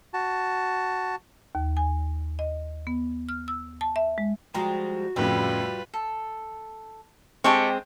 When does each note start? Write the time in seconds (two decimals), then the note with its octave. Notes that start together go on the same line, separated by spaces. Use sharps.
0.13 F#4 A5
1.55 D#2
1.77 G#5
2.39 D#5
2.87 B3
3.29 F6
3.48 E6
3.81 A5
3.96 E5
4.18 G#3
4.54 F3 G3 G#3 F#4 A#5
5.16 F2 A2 C#3 G3 F4 B4
5.94 A4
7.44 G#3 C4 G4 A4 C#6